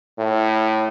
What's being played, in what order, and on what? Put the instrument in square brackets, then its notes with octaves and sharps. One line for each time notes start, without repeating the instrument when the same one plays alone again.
[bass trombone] A2